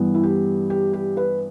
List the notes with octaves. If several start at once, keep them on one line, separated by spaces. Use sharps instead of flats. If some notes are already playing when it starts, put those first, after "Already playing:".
Already playing: G2 E3 B3
E4
G4
G4
G4
B4